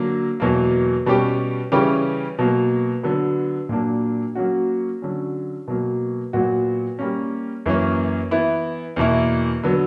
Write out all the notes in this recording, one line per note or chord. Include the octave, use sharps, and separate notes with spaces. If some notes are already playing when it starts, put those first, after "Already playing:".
Already playing: D3 F#3 A#3
E2 B2 F#3 A#3
B2 G3 C#4 G4
C#3 E3 G3 C#4 G4
B2 F#3 A#3
D3 F#3 B3
A#2 F#3 A#3 D4
F#3 A#3 C#4 F#4
D3 F#3 C#4
B2 F#3 A#3
A#2 F#3 B3 F#4
G3 A#3 C#4
F#2 E3 A#3 C#4
E3 B3 E4
E2 B2 A#3 E4
D3 F#3 B3